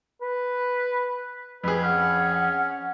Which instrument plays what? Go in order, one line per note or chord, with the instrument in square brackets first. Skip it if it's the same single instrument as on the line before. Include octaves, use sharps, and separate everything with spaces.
[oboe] B4
[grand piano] F2 G#4 [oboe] B4
[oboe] C#4 [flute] F#5